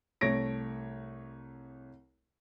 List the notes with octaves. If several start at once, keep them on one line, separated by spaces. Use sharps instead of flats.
C2 A3 C#5 A#6 D7